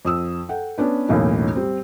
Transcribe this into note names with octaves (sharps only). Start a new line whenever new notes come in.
F2 D#6 E6
A4 F#5 G5
B3 C#4 D4 B4
B1 E2 A2 A#3 C#4 D#4
G3 C4